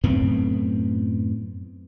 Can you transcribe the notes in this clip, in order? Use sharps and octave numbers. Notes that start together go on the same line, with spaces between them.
F#2 A2 B3 C4